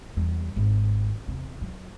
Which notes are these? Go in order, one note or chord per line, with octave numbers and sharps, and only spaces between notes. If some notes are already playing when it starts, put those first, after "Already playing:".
E2 G3
G#1
E2 C3
F#3